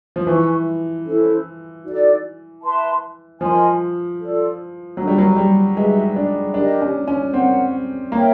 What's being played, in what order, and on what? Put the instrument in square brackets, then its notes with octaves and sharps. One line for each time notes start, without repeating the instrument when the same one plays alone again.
[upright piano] F3
[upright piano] E3 [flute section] B4 E5 G#5 C#6
[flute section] C#4 E4 A4 C5
D#4 F#4 A4 D5
B4 E5 A5 C6
[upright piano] F3 [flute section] A#4 D#5 G#5 C6
[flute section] F4 A4 D5
[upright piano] F#3 [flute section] D4 F4 A#4
[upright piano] G3
F#3
G3
[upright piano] G#3 [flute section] D#4 F#4 B4 E5
[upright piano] D4
[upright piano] D4 [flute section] G4 A#4 D#5
[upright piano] C#4
C#4
[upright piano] C4 [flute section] A#4 C#5 F#5
[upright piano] A#3 [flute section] A#4 C#5 E5 G5